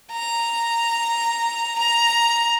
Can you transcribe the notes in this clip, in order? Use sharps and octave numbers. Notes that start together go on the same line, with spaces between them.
A#5
A#5